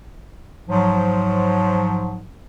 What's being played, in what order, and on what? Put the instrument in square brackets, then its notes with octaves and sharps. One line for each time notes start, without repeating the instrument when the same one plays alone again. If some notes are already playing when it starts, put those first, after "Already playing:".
[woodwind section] G#2 F3 F#3